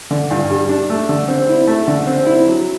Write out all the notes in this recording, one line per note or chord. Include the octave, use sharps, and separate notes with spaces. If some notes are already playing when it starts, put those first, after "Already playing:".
D3
G2
G3
D4
A3
D3
C4
E4
A3
D3
C4
E4
F#3